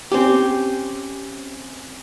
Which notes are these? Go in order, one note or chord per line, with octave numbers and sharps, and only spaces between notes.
C4 C#4 G4